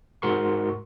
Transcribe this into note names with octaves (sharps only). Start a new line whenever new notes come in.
G#2 F#4 A#4 C6 C#6